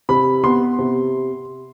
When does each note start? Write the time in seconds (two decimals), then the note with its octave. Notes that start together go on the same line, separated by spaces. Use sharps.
0.09 C3 B5
0.44 B3 C6
0.79 C3